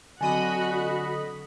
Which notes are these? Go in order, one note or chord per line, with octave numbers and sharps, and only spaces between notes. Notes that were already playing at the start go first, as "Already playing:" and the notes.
D3 F#3 C4 F#4 D#5 G#5 B5 D#7